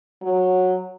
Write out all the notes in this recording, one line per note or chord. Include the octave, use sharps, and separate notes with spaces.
F#3